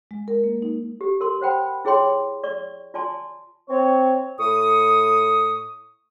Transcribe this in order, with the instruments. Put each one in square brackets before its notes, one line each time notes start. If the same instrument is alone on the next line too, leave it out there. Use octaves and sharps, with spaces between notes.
[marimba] G#3
A#4
A#3
D#4
[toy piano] G4
A#4 C6
C5 F#5 G5 B5
E4 G#4 C#5 G5 C6
D5 C#6
F4 D5 G#5 A5 C6
[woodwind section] C4 C#5
A2 C#6 D#6